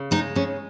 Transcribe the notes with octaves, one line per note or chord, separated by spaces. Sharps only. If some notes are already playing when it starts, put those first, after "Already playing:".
Already playing: C#3
G#3 D#4
C#3 C#4